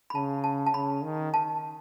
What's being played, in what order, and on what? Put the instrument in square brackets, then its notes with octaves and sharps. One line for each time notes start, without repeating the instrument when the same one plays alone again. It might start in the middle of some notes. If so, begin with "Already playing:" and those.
[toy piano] B5
[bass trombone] C#3 [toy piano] A5
[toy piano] A5
A5
[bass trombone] C#3 [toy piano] B5
[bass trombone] D#3
[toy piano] A5